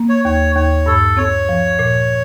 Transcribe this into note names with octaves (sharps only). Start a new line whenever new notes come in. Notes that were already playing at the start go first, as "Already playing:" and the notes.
Already playing: A#3
C#5
D#2 C#5
D#2 C#5
G2 A4
C4 C#5
F3
A#2